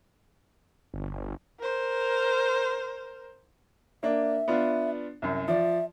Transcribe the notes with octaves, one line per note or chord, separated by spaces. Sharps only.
G1
A#4 C5
A#3 D4 E5
B3 D4 F4
C2 F#2
F3 D5 E5